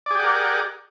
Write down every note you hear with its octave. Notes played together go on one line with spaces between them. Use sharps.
G4 G#4 A#4 D5 F#5